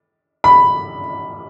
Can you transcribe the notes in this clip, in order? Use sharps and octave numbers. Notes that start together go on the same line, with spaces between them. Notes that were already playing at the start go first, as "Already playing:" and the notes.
B5